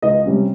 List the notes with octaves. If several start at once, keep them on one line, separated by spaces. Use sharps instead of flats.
C#2 D#5
C3 G3 C#4